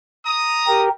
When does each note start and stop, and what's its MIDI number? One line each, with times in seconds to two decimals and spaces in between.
0.24 0.84 82
0.24 0.84 87
0.67 0.89 67
0.67 0.89 70